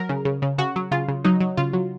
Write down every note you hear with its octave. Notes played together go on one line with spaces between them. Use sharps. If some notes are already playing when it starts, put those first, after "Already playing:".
Already playing: F#3 A#4
C#3
C#3
C#3
C#3 F#4
F#3
C#3 F4
C#3
F#3 D#4
F#3
C#3 F4
F#3